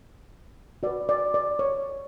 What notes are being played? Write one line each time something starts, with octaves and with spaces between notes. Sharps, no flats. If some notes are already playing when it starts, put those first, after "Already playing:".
F#4 B4 D5
D5
D5
C#5